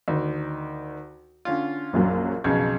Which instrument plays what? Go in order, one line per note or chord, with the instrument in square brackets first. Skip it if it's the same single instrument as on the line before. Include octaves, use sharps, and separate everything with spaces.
[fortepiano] D2 D#3
D3 C#4 F4
[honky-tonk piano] A#1 F#2 F#3
[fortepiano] B1 F2 C#3 [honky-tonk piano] G#6